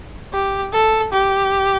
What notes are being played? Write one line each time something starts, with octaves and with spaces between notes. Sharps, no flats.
G4
A4
G4